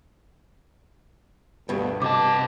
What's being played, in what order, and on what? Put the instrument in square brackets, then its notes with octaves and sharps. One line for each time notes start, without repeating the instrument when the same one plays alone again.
[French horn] D2 [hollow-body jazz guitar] G2 B2
[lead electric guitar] C3 A5 [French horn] D#5 [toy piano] D6